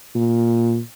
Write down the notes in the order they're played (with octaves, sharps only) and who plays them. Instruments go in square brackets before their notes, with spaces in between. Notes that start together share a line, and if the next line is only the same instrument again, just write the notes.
[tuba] A#2